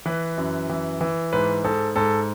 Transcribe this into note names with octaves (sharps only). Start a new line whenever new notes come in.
E3 B4
F#2
E3
E3
G#2 B4
G#2 A4
G#2 A4